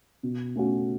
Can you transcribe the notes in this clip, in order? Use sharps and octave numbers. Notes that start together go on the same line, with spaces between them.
B2
A3 C#4 F#4